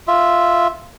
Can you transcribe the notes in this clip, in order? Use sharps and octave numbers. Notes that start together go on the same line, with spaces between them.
F4 E5